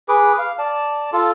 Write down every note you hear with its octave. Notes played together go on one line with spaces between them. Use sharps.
G#4 B4 D6
F5
D5 A5
F4 A4